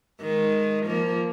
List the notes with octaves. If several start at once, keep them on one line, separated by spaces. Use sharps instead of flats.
D#3 G#3
F3 A#3